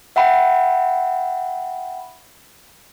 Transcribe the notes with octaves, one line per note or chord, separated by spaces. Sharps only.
E5 F#5 G5 B5